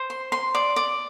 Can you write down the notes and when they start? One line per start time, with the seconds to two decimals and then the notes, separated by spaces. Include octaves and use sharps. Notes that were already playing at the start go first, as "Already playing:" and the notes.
Already playing: C5
0.10 C6
0.32 C6
0.55 D5
0.76 D5